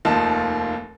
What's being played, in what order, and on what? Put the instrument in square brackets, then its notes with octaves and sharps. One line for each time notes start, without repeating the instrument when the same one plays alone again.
[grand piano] F1 D#2 D#3 F3 D#5 A5